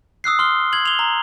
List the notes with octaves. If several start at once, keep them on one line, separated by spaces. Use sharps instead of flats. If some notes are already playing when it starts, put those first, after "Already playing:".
D#6 E6 F#6 C7
C6 F6 G7
G#6 F#7
F7 G7
A#5